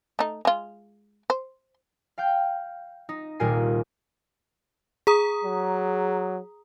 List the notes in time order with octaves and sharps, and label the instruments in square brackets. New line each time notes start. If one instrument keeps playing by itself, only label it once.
[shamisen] A3 D#4
G#3 F4
C5
[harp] F5 G5 G6
D#4
D#1 C2 A#2 A#4 G#5 C7
[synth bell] G#4 A#5 D#6
[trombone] F#3